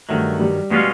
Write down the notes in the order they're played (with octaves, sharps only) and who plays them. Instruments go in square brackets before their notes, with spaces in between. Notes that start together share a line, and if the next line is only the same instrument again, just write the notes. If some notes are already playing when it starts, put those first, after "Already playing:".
[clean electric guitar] G2 D#3 F#3 [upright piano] A3
[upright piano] G3
[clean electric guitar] B2 G#3 C#4 F4 [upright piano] G3